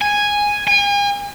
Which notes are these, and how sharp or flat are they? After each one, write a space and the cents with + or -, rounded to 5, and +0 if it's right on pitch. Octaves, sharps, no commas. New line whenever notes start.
G#5 -5
G#5 -40